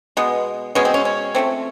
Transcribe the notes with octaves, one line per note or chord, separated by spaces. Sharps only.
B2 G#3 B3
B2 G#3 B3 C#4
C4
C#4
C#4
F3 A3 C4